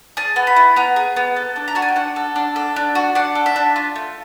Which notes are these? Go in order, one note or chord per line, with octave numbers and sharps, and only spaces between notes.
G#4 A5
B3
B5
E4
B3 A#5
G#4
B3
A4
D4
A#5
F#4 A5
G#5
G5
D4 F#5
A4
D4
A4
D4
F#4
D4 F#5
A4
E5
D4
F4
A3